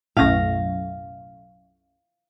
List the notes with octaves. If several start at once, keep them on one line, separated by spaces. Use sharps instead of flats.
B1 F#2 A2 F5 A#6